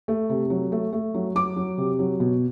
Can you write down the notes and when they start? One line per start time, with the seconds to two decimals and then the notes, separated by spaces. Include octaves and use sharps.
0.08 A3
0.29 C3
0.50 F#3
0.72 A3
0.93 A3
1.14 F#3
1.35 F#3 D6
1.56 F#3
1.78 C3
1.99 F#3
2.20 B2